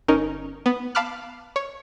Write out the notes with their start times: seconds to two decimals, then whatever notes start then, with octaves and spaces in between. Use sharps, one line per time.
0.08 G1 C#4 D#4 A#4
0.66 B3
0.95 F5 A5 B5 D6 F6 F#6
1.56 C#5